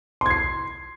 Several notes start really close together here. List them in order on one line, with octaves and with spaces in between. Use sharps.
C6 G#6 C7